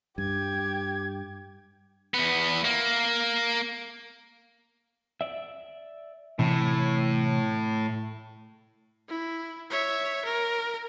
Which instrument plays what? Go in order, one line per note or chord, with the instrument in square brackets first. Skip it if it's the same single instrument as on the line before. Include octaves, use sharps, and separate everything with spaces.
[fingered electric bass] G2 [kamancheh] G4 [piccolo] G#6
[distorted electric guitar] E2 B3
A#3
[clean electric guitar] D5 E5
[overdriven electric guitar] A2 [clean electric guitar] C3 E3
[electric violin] E4
C#5 E5
A#4